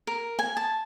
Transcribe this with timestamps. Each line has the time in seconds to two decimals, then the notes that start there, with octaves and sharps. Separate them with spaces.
0.07 A#4
0.39 G#5
0.57 A5